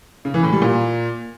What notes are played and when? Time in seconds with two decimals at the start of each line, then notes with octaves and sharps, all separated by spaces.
0.25 C#3
0.34 E3
0.43 A2
0.53 G3
0.62 A#2